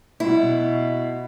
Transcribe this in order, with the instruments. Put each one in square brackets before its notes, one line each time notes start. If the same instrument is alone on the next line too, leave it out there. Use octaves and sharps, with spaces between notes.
[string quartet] B2 [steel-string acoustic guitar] E4